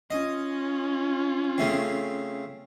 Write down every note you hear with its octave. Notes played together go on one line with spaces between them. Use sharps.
C#4 F4 D#5
C#3 A3 C4